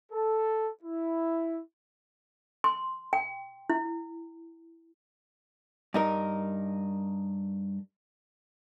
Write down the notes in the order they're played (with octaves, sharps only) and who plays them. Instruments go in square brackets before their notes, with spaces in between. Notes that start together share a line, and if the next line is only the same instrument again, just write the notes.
[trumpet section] A4
E4
[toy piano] C6
G5
E4
[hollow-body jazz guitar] G2 D#4 A#4